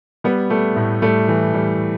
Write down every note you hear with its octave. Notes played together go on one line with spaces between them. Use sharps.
G3 B3
G3 A3
A2
G3 A3
E3
G3